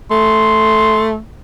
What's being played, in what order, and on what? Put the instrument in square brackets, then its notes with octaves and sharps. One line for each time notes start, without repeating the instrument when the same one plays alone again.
[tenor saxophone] A3 [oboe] C6